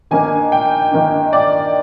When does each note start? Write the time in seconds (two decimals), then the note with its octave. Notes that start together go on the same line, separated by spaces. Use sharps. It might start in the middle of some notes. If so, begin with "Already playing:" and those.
0.11 D#3 A#3 D4 G#5
0.52 G5
0.92 D#3 A#3 D4
1.33 D5